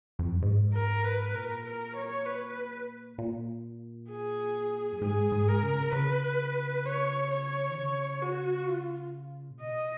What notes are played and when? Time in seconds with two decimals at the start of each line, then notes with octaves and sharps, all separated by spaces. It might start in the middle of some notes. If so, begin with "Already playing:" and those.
0.19 F2
0.32 F#2
0.42 G#2
0.74 A#4
1.04 B4
1.34 A#2 A#4
1.65 A#4
1.96 C#5
2.26 B4
3.18 A#2
4.10 G#4
4.93 F#2
5.01 G#2 G#4
5.32 G#2
5.47 A#4
5.63 C#3
5.93 C#3 B4
6.85 C#5
7.31 C#5
7.70 D#3
7.76 C#3 C#5
8.22 F#4
8.68 F4
9.51 A#2
9.60 B2 D#5